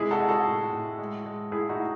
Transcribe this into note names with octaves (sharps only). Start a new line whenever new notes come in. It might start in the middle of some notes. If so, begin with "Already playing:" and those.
Already playing: C3 G#3 E4 G#4
F#4 A4
G#3
F#4 A4
A2
A2
G#3
G#3
A2 E4 G#4
D#4 F#4
A2